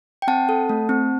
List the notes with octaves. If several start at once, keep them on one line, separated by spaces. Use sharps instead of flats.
G5
C4 F#5 A5
A4
A3
C4